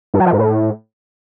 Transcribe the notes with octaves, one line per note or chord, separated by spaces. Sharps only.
G2
F#3
F3
G#2
A2